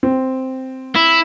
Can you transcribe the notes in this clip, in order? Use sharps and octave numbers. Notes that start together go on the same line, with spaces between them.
C4
E4